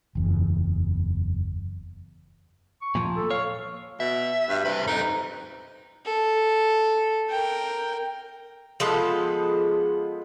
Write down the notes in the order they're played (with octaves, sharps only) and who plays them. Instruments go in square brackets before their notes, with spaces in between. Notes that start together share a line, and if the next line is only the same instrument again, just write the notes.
[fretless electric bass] F#1 E2
[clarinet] C#6
[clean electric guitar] A#2 F3
[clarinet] A4
[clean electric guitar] C#5 [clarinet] F5
[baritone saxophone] B2 [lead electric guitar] E5
[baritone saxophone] G2
[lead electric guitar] C2 B4 [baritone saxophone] C3
[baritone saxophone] D#4 [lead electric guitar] A4 C5
[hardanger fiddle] A4
A#4 G5
[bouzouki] F3 G#3 B3 A4